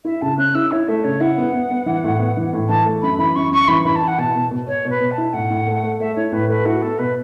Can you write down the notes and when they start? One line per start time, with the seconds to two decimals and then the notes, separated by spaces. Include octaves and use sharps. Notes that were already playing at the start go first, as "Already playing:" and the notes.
0.05 E4 E5
0.22 C#3 A5
0.38 C#4 F#6
0.55 E4 E6
0.72 E4 C#5
0.88 A3 E5
1.04 C#3 C#5
1.20 E4 F#5
1.38 B3
1.53 B3
1.71 B3
1.86 E3
2.04 A2
2.19 B3
2.37 E3
2.53 A2
2.69 E3 A5
2.85 A3
3.02 F#2 B5
3.19 E3 B5
3.36 F#2 C#6
3.51 F#2 C#6
3.68 E3 B5
3.85 E3 B5
3.96 A5
4.01 E4
4.08 F#5
4.18 B2 A5
4.35 B2
4.51 B2
4.67 B2 C#5
4.85 B2
4.90 B4
5.00 B2
5.11 A5
5.18 E4
5.33 A2 F#5
5.50 A2
5.67 A3
5.83 A3
6.00 A3 E5
6.16 E4 C#5
6.32 A2 B4
6.49 A3 B4
6.65 E4 F#4
6.82 B3 A4
6.99 B2 B4